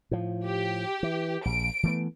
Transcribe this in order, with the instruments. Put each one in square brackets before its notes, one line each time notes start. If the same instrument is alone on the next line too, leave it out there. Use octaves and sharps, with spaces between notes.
[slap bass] A2 F3
[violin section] G4
[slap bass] E3
[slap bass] A#1 [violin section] D7
[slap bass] E3 A3 B3